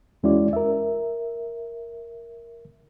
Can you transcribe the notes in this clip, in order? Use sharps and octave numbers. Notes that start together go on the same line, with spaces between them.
E2 G#3 C#4 E4 F#4 D5
A#4 E5